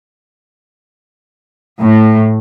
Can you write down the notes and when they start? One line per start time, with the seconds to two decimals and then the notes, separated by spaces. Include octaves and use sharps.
1.81 A2